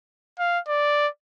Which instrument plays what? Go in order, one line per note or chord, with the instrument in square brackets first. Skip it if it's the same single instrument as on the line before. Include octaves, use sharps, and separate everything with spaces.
[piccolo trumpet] F5
D5